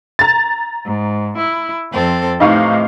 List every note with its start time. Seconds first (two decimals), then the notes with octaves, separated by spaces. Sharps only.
0.19 A#5 A6
0.84 G#2
1.37 E4
1.91 F2 C4 A4
2.40 A2 C3 E3 D#4 F5 C#6